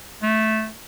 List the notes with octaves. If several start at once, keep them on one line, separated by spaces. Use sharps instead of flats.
A3